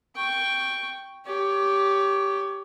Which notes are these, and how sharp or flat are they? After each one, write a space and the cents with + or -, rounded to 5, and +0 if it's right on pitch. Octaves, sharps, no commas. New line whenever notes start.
G5 +0 C#6 +0
G4 +0 C#5 +25